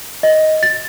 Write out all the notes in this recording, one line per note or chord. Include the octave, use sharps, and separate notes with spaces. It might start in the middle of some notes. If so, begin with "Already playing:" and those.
D#5
A6